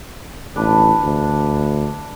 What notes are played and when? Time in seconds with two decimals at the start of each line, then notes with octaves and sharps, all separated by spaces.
0.56 A1 D4 B4
1.02 D2